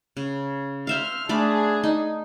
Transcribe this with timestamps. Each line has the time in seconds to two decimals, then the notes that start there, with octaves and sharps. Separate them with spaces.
0.17 C#3
0.87 C5 E5 F5 F6
1.29 A3 D4 G#4 D5 B5
1.84 D#4